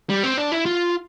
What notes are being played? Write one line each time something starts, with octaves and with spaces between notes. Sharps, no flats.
G3
C4
D4
E4
F4